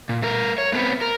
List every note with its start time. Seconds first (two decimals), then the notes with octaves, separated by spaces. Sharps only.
0.09 A#2
0.22 A3 A#4
0.58 C#5
0.72 A3 B3 C4 A4 B4
1.01 A#4